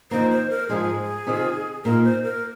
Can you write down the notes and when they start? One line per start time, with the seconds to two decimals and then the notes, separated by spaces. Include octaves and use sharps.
0.11 F2 D#3 A#3 C5
0.31 C5
0.50 A#4
0.69 G#2 F3 G#3 G#4
1.27 C3 D#3 C4 F4
1.85 A#2 A#3 D#4 A#4
2.04 C5
2.23 A#4